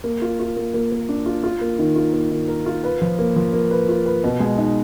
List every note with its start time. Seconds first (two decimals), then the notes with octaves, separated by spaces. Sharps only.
0.04 A#3
0.22 F4
0.39 F4
0.57 A#3
0.74 A#3
0.92 A#3
1.09 D4
1.26 F4
1.43 F4
1.61 A#3
1.79 D#3
1.96 F4
2.14 A#3
2.31 D#3
2.48 A#4
2.66 F4
2.84 B4
3.01 F3
3.19 A#3
3.36 F3
3.53 A#3
3.71 B4
3.89 F4
4.06 B4
4.24 B2
4.40 G#3
4.58 D#4